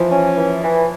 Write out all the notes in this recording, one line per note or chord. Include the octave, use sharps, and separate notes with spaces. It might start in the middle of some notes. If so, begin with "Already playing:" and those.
Already playing: E3 F3
C#4
E3
E3